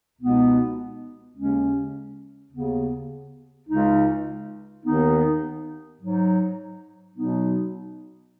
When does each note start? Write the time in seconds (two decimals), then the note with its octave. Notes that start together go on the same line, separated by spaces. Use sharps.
0.18 C#2 B2 B3 D#4
1.35 D#2 C#3 G#3 C#4
2.51 D#2 C#3 B3
3.67 C#2 C#3 G#3 D#4
4.84 D#2 D#3 B3 D#4
6.00 G#2 F#3 D#4
7.16 B2 F#3 B3 D#4